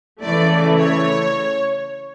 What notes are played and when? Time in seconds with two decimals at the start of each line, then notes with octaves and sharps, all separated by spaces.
0.21 C#3 E3 A3 D5
0.78 C#5